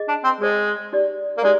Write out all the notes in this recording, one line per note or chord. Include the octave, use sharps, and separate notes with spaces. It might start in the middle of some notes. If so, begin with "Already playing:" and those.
Already playing: G#4 D#5
D4
C4
G#3 G#4 C5 D#5
D#4 G4 D5
A#3
G#3 D#4 G4 D5